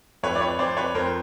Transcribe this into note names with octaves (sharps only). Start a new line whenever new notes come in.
F2 B4 C#5
D5
B4 C#5
F2 C5 D5
B4 C#5
F2 A#4 C5